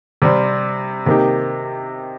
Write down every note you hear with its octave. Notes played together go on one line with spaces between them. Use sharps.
C3 G3 C4
C3 D#3 A#3 D#4 G4